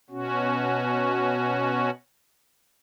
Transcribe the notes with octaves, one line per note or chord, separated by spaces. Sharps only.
B2 C#4 F#4